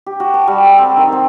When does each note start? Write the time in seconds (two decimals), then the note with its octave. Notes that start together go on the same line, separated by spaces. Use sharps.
0.06 G4
0.20 F#4
0.34 A5
0.48 G3
0.64 A4
0.78 C4
0.97 D#3
1.12 C4